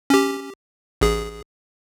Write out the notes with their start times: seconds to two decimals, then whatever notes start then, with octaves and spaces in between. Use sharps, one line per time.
0.10 C#4 G4
1.01 A1 G#4